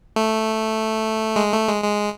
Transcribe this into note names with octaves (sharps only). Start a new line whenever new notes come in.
A3
G#3
A3
G#3
G#3